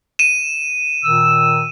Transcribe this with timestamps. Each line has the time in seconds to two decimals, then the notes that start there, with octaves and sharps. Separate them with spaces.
0.19 D#7 E7
1.04 A#2 D#3 E6